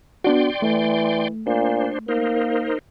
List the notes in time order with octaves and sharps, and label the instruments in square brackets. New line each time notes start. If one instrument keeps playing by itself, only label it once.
[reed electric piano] B3 D4 F#4 [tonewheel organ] D5 G5 C6
[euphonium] E3 [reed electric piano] A3
[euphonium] A#2 [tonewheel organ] D4 C5
[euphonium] A#3 [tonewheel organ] D#4 A#4 C5